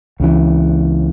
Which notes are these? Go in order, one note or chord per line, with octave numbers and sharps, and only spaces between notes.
C#2 C#3 E3